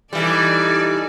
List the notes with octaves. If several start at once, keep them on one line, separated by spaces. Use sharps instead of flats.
E3 G3 D#4 A4 D5